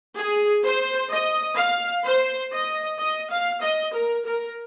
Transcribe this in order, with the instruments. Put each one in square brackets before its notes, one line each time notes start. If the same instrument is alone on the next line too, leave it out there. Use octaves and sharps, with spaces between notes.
[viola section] G#4
C5
D#5
F5
C5
D#5
D#5
F5
D#5
A#4
A#4